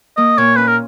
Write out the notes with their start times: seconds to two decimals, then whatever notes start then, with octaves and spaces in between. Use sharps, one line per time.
0.17 A#3 D#5
0.38 A#2 C#5
0.57 C#4 B4
0.68 A#4